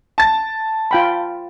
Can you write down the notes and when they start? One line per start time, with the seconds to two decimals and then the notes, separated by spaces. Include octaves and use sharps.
0.18 A5 A6
0.91 F4 G5 B5